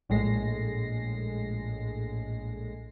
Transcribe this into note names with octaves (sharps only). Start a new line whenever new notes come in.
A#1 A2 G#3 A#6 C7